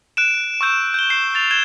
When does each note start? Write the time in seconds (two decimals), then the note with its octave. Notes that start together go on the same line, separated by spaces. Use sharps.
0.17 F#6 D7 E7
0.61 C#6 E6 G6 E7
0.94 G6 G7
1.10 G6 C7 E7
1.35 A6 F7
1.51 G#6 E7 G7